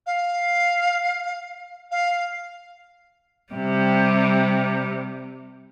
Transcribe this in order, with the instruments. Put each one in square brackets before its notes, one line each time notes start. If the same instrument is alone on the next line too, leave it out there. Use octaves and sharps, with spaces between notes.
[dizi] F5
F5
[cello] C3 G3